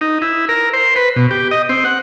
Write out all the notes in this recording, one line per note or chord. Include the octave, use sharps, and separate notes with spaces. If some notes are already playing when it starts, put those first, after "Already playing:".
D#4
E4
A#4
C5
B4
B2
G4
D#5
C4
F#5